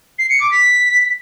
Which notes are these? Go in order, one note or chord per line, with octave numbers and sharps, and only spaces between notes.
C7
C#7
D6
B6